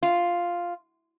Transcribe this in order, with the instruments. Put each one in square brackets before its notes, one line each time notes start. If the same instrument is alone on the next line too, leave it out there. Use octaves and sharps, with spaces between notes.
[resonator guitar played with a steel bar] F4